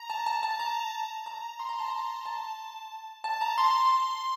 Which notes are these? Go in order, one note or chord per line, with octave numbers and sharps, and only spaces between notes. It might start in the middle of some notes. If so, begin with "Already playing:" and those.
Already playing: A#5
A5
A5
A5
A#5
A#5
C6
A#5
A5
A#5
A5
A5
A#5
C6